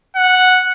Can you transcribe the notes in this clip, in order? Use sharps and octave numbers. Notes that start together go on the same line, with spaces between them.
F#5